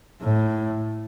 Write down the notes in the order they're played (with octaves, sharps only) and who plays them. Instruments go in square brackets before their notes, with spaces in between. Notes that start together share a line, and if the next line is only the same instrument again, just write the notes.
[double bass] A2